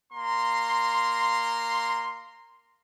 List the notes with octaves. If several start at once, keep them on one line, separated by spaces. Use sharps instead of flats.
A#3 A#5 C6